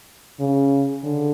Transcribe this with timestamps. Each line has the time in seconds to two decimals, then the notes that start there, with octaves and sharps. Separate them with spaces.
0.40 C#3
1.04 D3